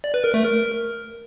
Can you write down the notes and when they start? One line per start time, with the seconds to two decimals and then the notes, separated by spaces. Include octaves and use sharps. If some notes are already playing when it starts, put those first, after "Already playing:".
0.04 D5
0.14 B4
0.24 A#4
0.34 A3
0.44 A#4